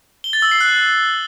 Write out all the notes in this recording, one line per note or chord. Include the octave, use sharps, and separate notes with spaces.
G7
A6
E6
C7
F#6